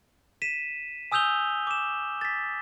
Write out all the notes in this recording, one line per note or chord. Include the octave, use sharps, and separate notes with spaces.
B6 D#7 E7
G#5 D#6 E6 G6 F7 G7
D6 E7
A6 B6